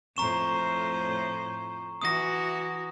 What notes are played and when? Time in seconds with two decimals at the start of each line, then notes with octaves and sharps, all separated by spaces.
0.17 F2 A2 C5 A#5 C#6 E7
2.01 E3 F#4 D#6 A#6